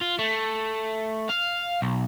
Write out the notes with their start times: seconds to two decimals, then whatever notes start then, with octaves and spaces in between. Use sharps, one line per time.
0.01 F4
0.19 A3
1.30 F5
1.82 B1